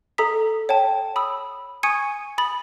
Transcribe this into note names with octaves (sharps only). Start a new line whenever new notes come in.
A4 A#5 D#6 B6
C#5 G5 A5
B5 D#6 E6
G#5 C#6 D#6 G#6 C#7 D#7
B5 D#6 A6 F#7